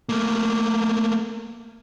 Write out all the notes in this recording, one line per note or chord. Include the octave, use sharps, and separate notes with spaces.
A3 A#3